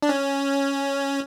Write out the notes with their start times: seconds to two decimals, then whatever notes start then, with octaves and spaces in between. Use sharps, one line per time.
0.03 D4
0.09 C#4